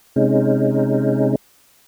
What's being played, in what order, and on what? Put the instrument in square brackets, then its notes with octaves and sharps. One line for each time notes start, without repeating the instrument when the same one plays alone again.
[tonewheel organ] C3 G#3 C#4 D#4